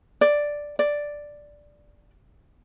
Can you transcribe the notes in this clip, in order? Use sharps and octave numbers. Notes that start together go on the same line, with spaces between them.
D5
D5